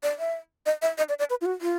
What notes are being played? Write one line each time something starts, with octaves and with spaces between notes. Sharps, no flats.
D5
E5
D#5
E5
D#5
D5
D5
B4
F4
F#4
F4